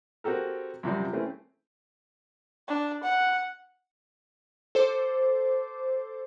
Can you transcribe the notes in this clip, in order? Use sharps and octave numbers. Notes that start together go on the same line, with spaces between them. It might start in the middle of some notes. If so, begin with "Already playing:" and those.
C4 F#4 G4 A4 A#4
F#2 C3 F3 G3
E3 A3 C4 C#4
D4
F#5
A4 C5 D6